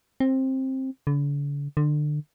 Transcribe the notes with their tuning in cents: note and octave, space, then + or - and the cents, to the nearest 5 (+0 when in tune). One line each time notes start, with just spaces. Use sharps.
C4 +15
D3 -45
D3 +25